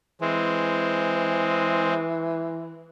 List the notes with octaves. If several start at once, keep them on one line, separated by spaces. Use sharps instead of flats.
E3 G#3 C4